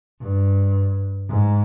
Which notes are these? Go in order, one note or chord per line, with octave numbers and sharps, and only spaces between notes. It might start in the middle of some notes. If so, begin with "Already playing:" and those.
G2
G#2